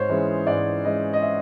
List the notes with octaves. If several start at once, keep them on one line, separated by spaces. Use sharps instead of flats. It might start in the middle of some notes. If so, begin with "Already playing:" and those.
Already playing: G#2 C5 C#5
E3 G#3 C#4 E4
G#2 D5
E3 G#3 C#4 E4 D#5
D#5
E5